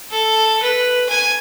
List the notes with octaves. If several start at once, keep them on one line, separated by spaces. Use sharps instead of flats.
A4
B4
G#5